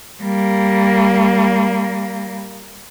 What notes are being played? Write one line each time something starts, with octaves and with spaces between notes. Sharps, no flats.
G3 A#3